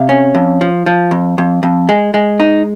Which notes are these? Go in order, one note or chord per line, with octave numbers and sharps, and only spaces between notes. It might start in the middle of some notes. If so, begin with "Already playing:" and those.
Already playing: C3 F5
C#4
F2
F3
F3
F2
F2
F2
G#3
G#3
D#4